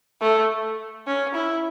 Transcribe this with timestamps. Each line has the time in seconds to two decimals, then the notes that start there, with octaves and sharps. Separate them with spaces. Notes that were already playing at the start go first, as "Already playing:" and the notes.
0.21 A3
1.07 C#4
1.35 E4